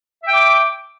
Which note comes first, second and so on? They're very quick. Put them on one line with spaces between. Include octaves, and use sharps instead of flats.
E5 G5 D6